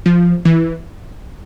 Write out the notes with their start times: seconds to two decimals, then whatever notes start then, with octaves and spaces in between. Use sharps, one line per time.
0.06 F3
0.45 E3